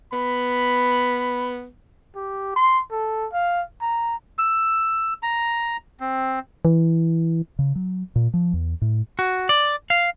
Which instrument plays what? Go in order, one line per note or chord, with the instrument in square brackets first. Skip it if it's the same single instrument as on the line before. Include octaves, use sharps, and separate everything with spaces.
[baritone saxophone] B3 [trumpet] B5
[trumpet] G4
C6
A4
F5
A#5
[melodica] E6
A#5
C4
[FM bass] E3
[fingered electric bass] C#3
F#3
A#2
F3
E2
A2
[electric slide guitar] F#4
D5
F5